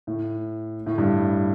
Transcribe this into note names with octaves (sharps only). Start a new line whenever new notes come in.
A2
A2
G2